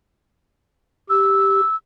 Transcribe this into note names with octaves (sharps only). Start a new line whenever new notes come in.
G4 E6